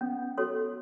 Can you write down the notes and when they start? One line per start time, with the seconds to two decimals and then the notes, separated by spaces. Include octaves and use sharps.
0.01 B3 C#4
0.38 F#4 A4 C#5